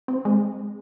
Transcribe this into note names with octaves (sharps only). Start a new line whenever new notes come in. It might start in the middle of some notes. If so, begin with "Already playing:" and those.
C4
G#3